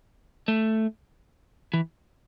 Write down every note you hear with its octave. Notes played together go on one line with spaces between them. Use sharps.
A3
E3